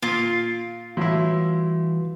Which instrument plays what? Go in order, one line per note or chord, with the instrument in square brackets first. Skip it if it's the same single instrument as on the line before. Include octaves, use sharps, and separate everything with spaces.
[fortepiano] A#2 [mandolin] F4
[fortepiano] A2 E4 [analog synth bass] E3 [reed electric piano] G3 F#4 C6